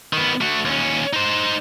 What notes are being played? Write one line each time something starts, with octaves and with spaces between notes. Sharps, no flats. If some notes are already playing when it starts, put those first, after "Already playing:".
D#3 B3
A3 F#4
D#2 C#4
D#4 C5